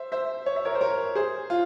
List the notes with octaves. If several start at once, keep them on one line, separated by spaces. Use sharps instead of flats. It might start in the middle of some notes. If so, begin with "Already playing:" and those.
Already playing: C5 E5
C5 E5
C#5
E5
A#4 C#5
C5
A#4 C#5
G#4 C5
F4